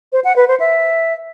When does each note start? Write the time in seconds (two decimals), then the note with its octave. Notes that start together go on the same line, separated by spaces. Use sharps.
0.13 C5
0.24 F#5
0.36 B4
0.48 C5
0.60 E5